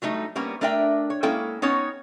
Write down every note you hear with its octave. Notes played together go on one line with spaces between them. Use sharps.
F#3 G3 A3 D#4
G3 A#3 B3 C#4
A3 D4 A#4 D5 E5 G5
C#5
G#3 A#3 C#4 E4 A4 G5
B3 C#4 D#4 C#5